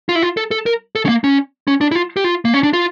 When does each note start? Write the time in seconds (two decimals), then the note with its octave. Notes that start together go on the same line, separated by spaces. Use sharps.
0.09 F4
0.15 E4
0.23 F4
0.37 A4
0.51 A4
0.66 A#4
0.95 A4
1.05 C#4
1.09 A#3
1.24 C#4
1.68 C#4
1.81 D4
1.92 E4
1.95 F4
2.17 G4
2.24 F4
2.45 A#3
2.54 C#4
2.63 D4
2.73 F4